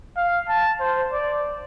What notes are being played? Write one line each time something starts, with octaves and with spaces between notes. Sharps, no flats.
F5
A5
C5
D5